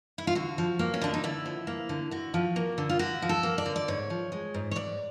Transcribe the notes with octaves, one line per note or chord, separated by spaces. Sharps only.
E4
F4
D3 F#4
F3
A#3
C#4
D3 D4
D#4
D3 E4
F3
A#3
D3
D3 F#4
F3
A#3
D3
F4
D3 F#4
F3
A4
A#3
D5
D3
D5
G#2 C#5
F3
G#3
G#2
C#5
G#2 D5